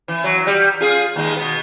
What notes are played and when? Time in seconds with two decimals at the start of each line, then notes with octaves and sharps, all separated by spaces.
0.08 E3
0.24 F#3
0.47 G3
0.80 F4 G#4
1.16 D#2 G#3
1.36 B2 B3